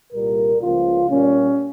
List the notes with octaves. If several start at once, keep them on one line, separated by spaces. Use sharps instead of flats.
C2 A#2 G3 A#3 A#4
C#2 C#3 F3 A#3 F4
A#2 G3 A#3 C#4